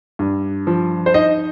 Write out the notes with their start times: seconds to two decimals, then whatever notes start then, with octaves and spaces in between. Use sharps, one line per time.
0.19 G2
0.67 F3
1.06 C5
1.14 D#4 D#5